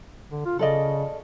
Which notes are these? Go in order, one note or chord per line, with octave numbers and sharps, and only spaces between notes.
D3
F4
C#3 A4 D5 D#5